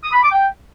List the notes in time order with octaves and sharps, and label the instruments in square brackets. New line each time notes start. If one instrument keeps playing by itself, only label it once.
[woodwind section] D#6
B5
D6
G5